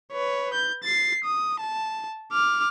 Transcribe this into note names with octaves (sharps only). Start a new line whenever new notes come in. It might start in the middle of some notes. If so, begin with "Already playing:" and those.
B4 C#5
G6
A6 C7
D#6
A5
D6 F6